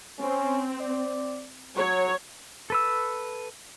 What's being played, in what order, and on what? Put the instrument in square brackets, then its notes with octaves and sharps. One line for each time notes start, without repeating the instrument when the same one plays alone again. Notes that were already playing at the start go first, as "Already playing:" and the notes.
[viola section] C4 [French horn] C#4
[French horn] D5
[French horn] F#3 [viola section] C#5
[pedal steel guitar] A4 B4 E6